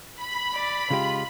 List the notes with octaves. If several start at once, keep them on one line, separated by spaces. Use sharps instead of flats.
B5
D5
C#3 G#3 F4 G4